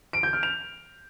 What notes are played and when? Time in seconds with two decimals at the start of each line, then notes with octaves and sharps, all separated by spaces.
0.13 D7
0.23 G6
0.33 F6
0.43 F7